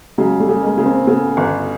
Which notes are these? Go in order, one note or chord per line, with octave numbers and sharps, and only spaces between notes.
C#3 F#3 G#3
G3 A3
C#3
G#3 A#3
C#3
A#3 C4
A#3
C#3 A3 B3
G1